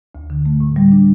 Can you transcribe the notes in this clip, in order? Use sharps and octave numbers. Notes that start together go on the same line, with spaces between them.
D2
D3
A3
A2
G3
D4